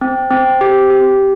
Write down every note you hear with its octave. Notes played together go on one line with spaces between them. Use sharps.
C4
C4
G4
G4